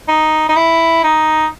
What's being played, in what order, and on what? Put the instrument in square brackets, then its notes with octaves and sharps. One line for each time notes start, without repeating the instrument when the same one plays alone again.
[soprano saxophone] D#4
D#4
E4
D#4